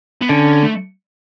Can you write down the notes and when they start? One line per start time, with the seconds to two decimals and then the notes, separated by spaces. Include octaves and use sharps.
0.21 B3
0.29 D3 C#4
0.63 A3